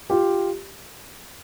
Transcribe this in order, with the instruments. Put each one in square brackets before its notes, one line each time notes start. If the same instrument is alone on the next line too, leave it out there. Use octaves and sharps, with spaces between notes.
[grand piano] F4 G4